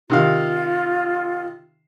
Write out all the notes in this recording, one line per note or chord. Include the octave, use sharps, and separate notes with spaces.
C3 D#3 F4 F5